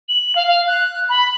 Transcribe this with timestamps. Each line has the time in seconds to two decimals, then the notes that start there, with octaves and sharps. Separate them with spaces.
0.08 F#7
0.35 F5
0.47 F5
0.67 F#6
1.09 B5